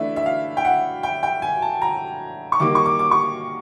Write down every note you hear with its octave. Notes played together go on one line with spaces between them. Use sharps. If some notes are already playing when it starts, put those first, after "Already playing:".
Already playing: E3 A3 D4 E5
E5
F5
G5
F#5
G5
G5
G#5
A5
A#5
C#6
D#3 G3 A#3 D6
C#6
D6
D6
C#6